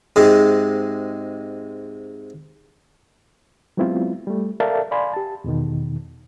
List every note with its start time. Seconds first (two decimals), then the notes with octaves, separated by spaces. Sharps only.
0.16 G#2 C3 G#3
3.77 F#3 G#3 B3 C4 E4 F4
4.27 G3 A3
4.60 A4 A#4 D5 E5 F5 A5
4.91 D5 F5 G#5 B5 C6
5.13 G4 A5
5.44 E2 B2 D#3